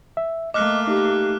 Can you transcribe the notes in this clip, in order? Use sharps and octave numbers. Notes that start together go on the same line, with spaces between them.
E5
A3 A#3 D#5 D6 F6 F#6
D#4 G4